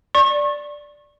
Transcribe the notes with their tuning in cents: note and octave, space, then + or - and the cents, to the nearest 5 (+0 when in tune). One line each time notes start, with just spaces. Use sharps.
D5 +0 C#6 -35